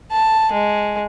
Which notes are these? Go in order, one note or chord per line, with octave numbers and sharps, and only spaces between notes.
A5
G#3